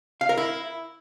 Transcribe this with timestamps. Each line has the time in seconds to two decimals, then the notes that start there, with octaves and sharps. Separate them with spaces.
0.21 F5
0.29 A#4
0.37 E4